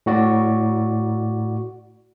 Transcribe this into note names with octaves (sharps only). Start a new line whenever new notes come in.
A2 F#4 D5